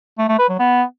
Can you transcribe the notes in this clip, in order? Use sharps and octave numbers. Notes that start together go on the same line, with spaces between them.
A3
A3
B4
F#3
B3